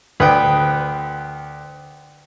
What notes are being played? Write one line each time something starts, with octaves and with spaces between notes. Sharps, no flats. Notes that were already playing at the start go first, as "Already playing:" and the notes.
D2 B4 G5 D#6